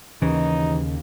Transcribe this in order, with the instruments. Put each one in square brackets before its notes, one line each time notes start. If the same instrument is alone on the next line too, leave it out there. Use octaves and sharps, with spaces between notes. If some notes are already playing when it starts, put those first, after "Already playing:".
[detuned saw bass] D#2 [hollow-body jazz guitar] C#3 [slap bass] E3 [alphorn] D#4